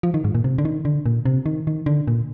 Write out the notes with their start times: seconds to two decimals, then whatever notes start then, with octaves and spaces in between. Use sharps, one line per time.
0.03 F3
0.14 D#3
0.24 G#2
0.35 A#2
0.44 C3
0.58 D3
0.65 D#3
0.85 D3
1.06 A#2
1.25 C3
1.46 D#3
1.67 D#3
1.86 D3
2.07 A#2